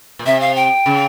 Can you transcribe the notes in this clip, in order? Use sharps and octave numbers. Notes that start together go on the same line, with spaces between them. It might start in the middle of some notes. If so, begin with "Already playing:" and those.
A#2
C3 E5
F5
G5
C#3